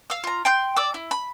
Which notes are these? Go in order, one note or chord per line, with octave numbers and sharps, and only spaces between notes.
F5 E6
F4 A#5
G5 C6 G6
D5 D6 E6
E4
B5